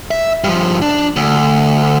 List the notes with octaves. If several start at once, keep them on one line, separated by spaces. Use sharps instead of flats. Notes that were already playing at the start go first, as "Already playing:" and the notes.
E5
G2 F3
D4
D2